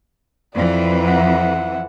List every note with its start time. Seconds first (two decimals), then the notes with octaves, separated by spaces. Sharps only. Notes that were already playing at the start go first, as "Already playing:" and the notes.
0.54 F2 E3 D5
1.05 E5 F#5